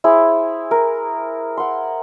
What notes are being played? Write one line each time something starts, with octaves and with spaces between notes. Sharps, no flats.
E4 G#4 C5
A#4
F#5 C6